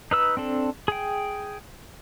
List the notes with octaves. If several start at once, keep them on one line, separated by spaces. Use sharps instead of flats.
D#4 B4 E6
C4 D4 A4
G#4 G5